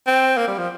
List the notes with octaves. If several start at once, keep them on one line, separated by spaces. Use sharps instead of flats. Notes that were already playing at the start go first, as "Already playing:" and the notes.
C4
A#3
G3
F3